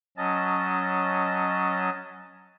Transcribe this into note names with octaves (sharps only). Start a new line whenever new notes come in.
F#3 C#4 D#5 A5